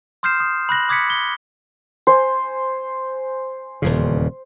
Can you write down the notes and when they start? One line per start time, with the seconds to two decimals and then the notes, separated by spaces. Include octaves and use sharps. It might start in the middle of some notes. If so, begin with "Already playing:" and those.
0.23 C6 D#6 F6 G6 C7 E7
0.40 D#6
0.69 B5 F#6 A#6 F#7
0.89 D6 D#6 G#6 A#6 B6 C#7
1.10 G7
2.07 C5 G#5
3.82 D#1 E2 C#3